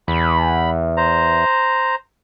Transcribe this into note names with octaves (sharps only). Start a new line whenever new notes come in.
E2 B5
C5 A#5